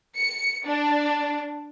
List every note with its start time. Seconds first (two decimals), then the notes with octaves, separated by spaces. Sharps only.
0.16 C#7
0.65 D4